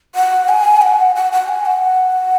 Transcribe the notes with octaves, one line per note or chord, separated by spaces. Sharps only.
F#5
G#5
F#5
F#5
F#5
G#5
F#5